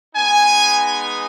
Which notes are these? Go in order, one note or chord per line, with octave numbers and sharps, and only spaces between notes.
G#3 B3 D#4 G#5